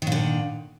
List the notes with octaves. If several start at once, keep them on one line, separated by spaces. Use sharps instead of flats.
A#2 D3 D#3